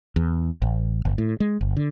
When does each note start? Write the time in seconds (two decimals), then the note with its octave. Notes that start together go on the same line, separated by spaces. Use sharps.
0.16 E2
0.62 A1
1.05 G1
1.18 A2
1.40 G#3
1.61 G1
1.77 D3